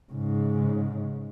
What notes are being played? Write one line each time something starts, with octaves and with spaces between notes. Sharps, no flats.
G#2 C#3